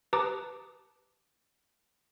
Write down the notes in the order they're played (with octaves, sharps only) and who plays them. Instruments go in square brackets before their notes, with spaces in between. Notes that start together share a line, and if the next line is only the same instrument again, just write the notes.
[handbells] G4 B4 A5 A#5 D6 D#6